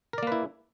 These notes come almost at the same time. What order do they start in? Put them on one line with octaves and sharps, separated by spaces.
A#4 D5 A#3 B4 E4